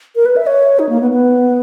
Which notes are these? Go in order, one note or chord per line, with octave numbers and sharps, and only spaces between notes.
A#4
B4
E5
C#5
D#4
A#3
B3
B3